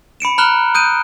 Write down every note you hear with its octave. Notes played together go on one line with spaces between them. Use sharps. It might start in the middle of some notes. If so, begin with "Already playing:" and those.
B5 C#7 D7 E7
A#5 B5 F6 F#6 E7 G7
D#6 F#6 G6 D7 D#7